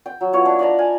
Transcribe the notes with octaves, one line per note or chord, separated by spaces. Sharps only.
G5
F#3
B3 E4 F4 C#5
D4
D5 D#5 A5 A#5
F5 G#5